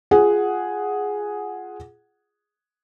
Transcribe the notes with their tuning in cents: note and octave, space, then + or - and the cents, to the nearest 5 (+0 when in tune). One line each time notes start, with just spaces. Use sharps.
F4 +0 G#4 +0 F#5 +0